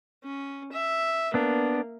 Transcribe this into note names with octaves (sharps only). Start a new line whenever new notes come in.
C#4
E5
A#3 B3 D4